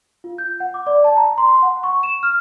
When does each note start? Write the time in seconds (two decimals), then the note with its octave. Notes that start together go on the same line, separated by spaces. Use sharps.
0.24 F4
0.38 G6
0.60 F#5
0.74 D6
0.87 D5
1.04 A5
1.17 A#5
1.38 C6
1.62 F#5
1.83 C#6
2.03 E7
2.23 F6